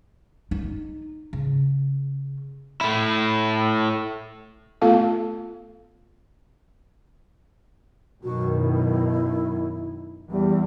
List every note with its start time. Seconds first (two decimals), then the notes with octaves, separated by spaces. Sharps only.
0.51 D#4
1.33 C#3
2.81 A3 E4
4.81 A3 B3 F4 A4 F5 A5
8.23 F#2 B2 D#3 F#4
8.56 E4
10.30 E2 G3